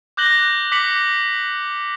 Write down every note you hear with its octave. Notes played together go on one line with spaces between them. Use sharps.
D6 F#6 G6 A#6 F#7 G7
D6 B6 C#7 F#7